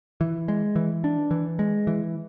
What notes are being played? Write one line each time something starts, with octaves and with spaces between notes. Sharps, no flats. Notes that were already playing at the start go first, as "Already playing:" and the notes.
E3
G#3
E3
D4
E3
G#3
E3